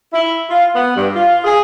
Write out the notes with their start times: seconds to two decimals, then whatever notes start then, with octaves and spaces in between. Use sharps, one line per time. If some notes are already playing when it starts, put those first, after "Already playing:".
0.12 E4
0.49 F4
0.75 B3
0.95 G2
1.15 F4
1.45 G#4